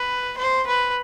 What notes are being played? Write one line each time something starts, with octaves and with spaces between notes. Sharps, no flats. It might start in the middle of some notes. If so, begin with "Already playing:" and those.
Already playing: B4
C5
B4